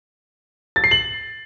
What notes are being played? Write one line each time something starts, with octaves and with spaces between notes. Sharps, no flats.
A6
C7
F#7